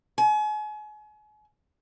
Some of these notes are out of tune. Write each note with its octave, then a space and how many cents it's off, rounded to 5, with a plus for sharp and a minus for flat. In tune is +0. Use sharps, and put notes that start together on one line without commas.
G#5 +35